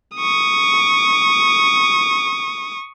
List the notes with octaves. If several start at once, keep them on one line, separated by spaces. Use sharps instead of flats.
C#6 D#6